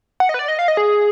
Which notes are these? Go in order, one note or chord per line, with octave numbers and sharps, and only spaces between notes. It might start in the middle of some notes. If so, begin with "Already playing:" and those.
F#5
D#5
B4
D5
D#5
F5
D#5
G#4